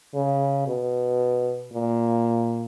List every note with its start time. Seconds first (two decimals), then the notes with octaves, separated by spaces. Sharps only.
0.15 C#3
0.67 B2
1.73 A#2